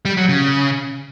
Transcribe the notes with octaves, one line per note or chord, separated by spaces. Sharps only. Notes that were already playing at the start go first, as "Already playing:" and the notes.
G3
F#3
C#3